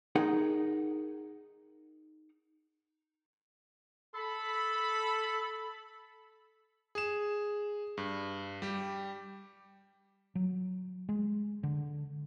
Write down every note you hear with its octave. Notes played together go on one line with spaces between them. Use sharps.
D#4 G#4 A#4 F#5
A4 B5
G#4 E7
G2
G3 G4
F#3
G#3
D3